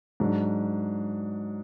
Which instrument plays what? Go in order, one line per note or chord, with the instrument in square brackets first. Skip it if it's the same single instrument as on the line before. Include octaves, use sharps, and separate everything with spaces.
[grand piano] G#2 F#3 D4